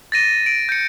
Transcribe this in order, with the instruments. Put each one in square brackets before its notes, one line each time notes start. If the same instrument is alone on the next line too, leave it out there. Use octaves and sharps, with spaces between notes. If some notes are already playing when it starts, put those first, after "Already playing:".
[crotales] A6 A#6 D#7
D7
G6 C#7